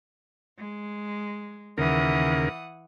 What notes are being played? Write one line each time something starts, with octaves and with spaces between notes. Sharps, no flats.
G#3
D#2 C#3 E3 A#4 F#5 D#6